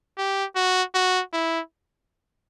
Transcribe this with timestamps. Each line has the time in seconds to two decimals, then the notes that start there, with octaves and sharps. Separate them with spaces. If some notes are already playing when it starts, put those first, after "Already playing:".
0.18 G4
0.56 F#4
0.95 F#4
1.33 E4